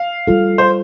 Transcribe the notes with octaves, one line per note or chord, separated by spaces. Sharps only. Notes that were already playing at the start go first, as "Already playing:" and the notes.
Already playing: F5
G3 F4 A4
C5